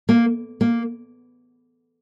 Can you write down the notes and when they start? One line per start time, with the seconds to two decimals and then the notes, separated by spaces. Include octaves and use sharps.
0.09 A#3
0.61 A#3